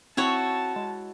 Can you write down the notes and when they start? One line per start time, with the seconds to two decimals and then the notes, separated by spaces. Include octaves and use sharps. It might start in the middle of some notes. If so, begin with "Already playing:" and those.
0.17 C4 E4 F#4 C#5 A5
0.76 G#3